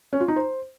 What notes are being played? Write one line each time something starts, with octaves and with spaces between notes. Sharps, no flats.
C#4
F4
D#4
C5